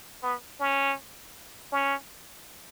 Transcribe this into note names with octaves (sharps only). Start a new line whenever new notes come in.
B3
C#4
C#4